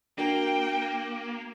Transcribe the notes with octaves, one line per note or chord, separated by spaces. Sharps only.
A#3 D4 F#4 A#4 G5